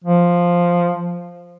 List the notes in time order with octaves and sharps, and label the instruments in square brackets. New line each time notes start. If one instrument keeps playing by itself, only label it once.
[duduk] F3